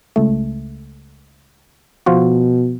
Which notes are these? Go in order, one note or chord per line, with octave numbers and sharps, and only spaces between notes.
C#2 A3
B2 F3 F4 F#4